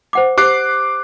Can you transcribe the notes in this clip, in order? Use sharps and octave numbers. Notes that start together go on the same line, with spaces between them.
C5 F#5 D6
G4 C5 D6 F#6 C7